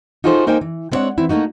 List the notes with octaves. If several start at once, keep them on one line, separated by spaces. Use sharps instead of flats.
D#4 F4 F#4 G#4 A4 C5
A#3 D#4 A#4 C5 G5 G#5
E3
G#3 B3 C4 D4 C#5 F#5
E3 C4 E4
A3 A#3 D#4 F#4